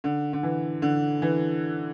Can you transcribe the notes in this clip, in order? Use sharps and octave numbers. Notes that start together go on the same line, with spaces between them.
D3
D3
E3
D3
E3